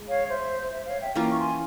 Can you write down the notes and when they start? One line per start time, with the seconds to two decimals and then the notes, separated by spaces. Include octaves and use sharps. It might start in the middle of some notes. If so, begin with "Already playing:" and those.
Already playing: G#3
0.08 C#5 F5
0.30 C5 E5
0.73 C5 E5
0.87 C#5 F5
1.01 E5 G5
1.16 E3 A#3 C#4 F4 G5 A#5
1.29 C#6
1.38 G#5 C6